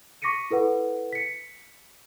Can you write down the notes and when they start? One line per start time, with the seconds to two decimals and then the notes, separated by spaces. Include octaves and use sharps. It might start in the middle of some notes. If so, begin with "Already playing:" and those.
0.22 C#6 D6 A#6 B6 C#7 D#7
0.51 E4 A4 B4 F#5
1.13 B6 C#7